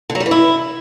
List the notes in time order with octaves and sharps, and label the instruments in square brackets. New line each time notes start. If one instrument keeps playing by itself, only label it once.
[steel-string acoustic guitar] D3
F#3
G3
E3
E4